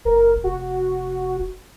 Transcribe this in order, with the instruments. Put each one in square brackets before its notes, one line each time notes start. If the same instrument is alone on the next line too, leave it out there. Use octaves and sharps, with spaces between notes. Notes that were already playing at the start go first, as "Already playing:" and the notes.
[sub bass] F#1 [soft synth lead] A#4
[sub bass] F1 [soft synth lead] F#4